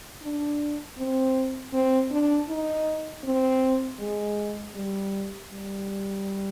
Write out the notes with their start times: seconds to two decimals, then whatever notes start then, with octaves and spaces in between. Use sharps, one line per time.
0.23 D4
0.98 C4
1.73 C4
2.11 D4
2.49 D#4
3.24 C4
4.00 G#3
4.75 G3
5.51 G3